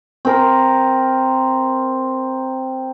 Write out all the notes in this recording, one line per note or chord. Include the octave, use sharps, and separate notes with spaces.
C4 A#4